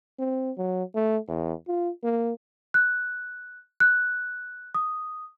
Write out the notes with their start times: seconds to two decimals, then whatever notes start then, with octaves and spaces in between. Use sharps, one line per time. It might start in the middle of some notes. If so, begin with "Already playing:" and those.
0.19 C4
0.57 F#3
0.95 A3
1.28 E2
1.68 F4
2.04 A#3
2.74 F#6
3.80 F#6
4.75 D#6